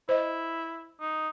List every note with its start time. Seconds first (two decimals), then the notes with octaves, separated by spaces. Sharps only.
0.09 E4 C5 D#5
1.00 D#4